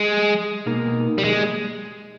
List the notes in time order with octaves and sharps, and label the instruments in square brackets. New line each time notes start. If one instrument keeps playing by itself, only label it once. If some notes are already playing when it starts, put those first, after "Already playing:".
Already playing: [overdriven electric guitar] G#3
[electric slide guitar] B2 A#3 D#4 A#4
[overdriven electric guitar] G3
G#3